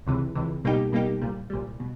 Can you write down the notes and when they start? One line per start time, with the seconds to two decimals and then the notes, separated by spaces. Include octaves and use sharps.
0.07 C#2 C3 E3
0.35 C#2 C3 E3
0.64 B2 G3 A#3 D#4 G4
0.92 B2 G3 A#3 D#4 G4
1.21 C2 A#2 G3
1.50 C2 A#2 G3
1.80 B2